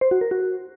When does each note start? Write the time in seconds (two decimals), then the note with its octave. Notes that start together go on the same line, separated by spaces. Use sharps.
0.01 C5
0.11 F#4
0.21 A#4
0.31 F#4